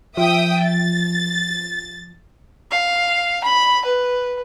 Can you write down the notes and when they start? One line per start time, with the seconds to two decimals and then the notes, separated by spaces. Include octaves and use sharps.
0.17 F3 E5 G5 D#6
0.63 A6
2.71 F5
3.44 B5
3.85 B4